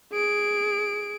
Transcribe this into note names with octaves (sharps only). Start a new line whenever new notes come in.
G#4 D7